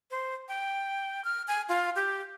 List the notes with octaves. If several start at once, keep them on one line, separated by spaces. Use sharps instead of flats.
C5
G5
F6
G#5
F4
G4